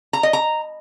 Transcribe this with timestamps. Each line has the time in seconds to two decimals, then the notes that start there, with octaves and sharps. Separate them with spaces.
0.13 A#5
0.23 D#5
0.33 A#5